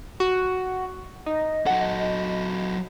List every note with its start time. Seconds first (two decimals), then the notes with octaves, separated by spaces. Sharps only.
0.20 F#4
1.26 D#4 D#5
1.66 F#3 A4 F#5